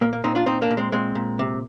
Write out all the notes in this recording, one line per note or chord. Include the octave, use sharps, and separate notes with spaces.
A#2 A#3
A#3
A#2 C4 D#4
D4 F4
A#2 C4 D#4
A#3 D4
A#2
G#3 C4
A#2 G#3 C4
A#2
C3